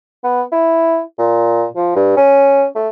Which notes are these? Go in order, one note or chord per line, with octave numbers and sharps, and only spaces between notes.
B3
E4
A#2
F3
G2
C#4
A3